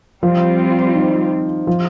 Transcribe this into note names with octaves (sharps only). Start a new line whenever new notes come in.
F3 G3 C4 F4
D#3
F3